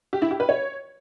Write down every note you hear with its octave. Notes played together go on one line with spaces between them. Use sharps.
G4
E4
G4
B4
C#5